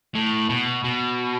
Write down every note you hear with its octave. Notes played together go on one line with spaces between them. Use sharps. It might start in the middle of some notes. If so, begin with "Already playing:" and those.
A2
B2
B2